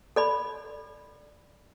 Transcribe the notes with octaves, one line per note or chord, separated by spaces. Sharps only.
A4 D5 B5